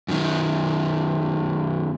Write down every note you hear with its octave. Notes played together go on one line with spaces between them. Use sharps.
F#2 D#3